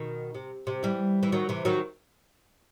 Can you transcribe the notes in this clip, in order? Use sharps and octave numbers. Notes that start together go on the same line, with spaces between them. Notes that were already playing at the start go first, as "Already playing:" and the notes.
Already playing: B2 D#3
C3
C3
E3 G3
E3
D#3 F#3
C3 E3
D#3 F#3